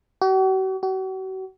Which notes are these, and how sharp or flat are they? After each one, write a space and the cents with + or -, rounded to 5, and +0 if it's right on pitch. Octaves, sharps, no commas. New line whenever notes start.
F#4 +45
F#4 +40